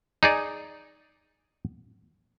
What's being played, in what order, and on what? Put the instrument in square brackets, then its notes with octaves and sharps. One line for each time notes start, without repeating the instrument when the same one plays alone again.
[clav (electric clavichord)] D#4 G#4 D5